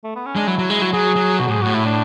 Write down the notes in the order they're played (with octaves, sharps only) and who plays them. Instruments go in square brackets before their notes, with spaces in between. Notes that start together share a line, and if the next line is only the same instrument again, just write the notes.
[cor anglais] A3
B3
C#4
[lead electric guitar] G#3 [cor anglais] D4
[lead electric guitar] F#3 [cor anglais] E4
[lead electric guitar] F#3
G#3
F#3
[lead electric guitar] F#3 [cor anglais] G#4
[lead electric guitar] F#3
[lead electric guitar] B2 [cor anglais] F#4
[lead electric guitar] A2 [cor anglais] G#4
[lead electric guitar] G#2
[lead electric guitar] A2 [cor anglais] F#4
[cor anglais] E4
D4